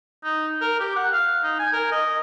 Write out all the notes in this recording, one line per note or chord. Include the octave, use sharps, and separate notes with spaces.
D#4
A#4
G4
F#5
F5
D#4
G#5
A#4
D#5